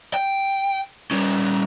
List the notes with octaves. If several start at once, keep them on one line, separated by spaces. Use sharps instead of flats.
G5
G3 C#4